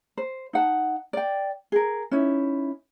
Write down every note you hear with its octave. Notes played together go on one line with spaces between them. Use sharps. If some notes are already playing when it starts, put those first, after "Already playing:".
C5
D#4 F#5 A5
D5 G5
G#4 A#4
C#4 D#4 E4